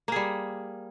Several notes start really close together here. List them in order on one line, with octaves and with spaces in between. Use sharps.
A#3 G#4 G3